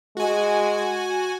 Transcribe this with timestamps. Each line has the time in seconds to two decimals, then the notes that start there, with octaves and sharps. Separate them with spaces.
0.17 G#3 F#4 G#5